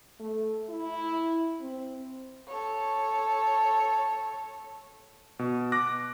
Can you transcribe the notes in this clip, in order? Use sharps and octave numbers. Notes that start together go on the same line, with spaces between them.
A3
E4
C4
A4 C#5
B2
D6 F#6 A#6